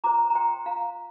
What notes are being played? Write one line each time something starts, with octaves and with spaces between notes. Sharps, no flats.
F4 C5 A#5 D6
A#5
F4 C5 G5 C6
F4 C5 F5 A#5